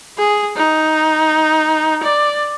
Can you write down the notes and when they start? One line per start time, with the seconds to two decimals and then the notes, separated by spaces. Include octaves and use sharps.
0.18 G#4
0.56 D#4
2.03 D5